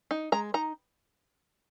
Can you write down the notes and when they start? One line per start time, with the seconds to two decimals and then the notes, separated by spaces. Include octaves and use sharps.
0.11 D#4
0.32 G#3 A#5
0.54 D#4 A#5